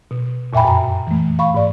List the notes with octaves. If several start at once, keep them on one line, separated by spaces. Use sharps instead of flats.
B2
F2 A#2 E5 G5 G#5 B5
F#2 A#5
E3 A3
F5 B5 C#6
G#2 D5